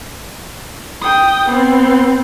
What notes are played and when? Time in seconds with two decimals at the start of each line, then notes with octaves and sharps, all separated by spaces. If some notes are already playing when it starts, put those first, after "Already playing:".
1.02 G5 D#6
1.49 B3 C4